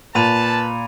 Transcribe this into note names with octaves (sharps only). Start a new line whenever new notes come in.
A#2 B4 A5 B5 D#7 F7